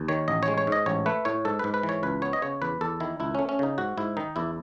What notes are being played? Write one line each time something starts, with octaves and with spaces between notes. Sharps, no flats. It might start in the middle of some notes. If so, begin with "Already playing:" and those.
Already playing: D#2
D#3 C#5
A1 D#5
C#5
G#3
C#5
G#2 D#5
A1 C#5
A3 B4
A2 C#5
G#2 A4
G#2 B4
B4
E3
C#5
C#2 B4
B3 C#5
D#5
C#3 C#5
E2 B4
E2 A4
D#3 E4
C#2 E4
A3 C#4
C#4
C#3 D#4
G#2 F#4
G#2 E4
D#3 D#4
E2 E4